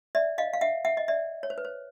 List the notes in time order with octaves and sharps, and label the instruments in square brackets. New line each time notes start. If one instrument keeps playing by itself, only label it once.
[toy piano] D5 E5
D#5 F5
F5
E5 F#5
E5 F#5
D#5
D5 E5
C#5
C5
B4
C5